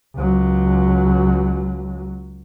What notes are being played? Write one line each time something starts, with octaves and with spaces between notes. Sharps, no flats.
C#2 F#3